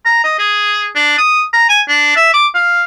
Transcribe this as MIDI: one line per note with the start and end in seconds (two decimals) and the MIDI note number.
0.05 0.23 82
0.24 0.35 75
0.39 0.88 68
0.95 1.15 62
1.18 1.43 87
1.53 1.65 82
1.69 1.81 80
1.88 2.15 62
2.16 2.29 76
2.34 2.47 86
2.54 2.84 77